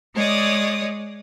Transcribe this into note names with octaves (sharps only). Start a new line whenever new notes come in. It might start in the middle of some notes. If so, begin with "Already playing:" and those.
G#3 C#5 D5 D#6